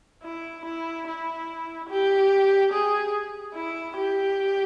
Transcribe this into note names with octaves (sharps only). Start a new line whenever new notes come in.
E4
E4
E4
G4
G#4
E4
G4